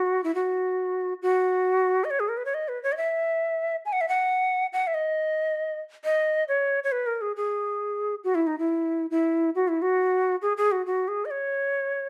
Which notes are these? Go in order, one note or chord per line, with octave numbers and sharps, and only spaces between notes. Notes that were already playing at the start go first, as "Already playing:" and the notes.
Already playing: F#4
E4
F#4
F#4
D#5
C#5
G#4
A#4
B4
C#5
D#5
B4
C#5
D#5
E5
G#5
F#5
E5
F#5
F#5
E5
D#5
D#5
C#5
C#5
B4
A#4
G#4
G#4
F#4
E4
D#4
E4
E4
F#4
E4
F#4
G#4
G#4
F#4
F#4
G#4
D#5
C#5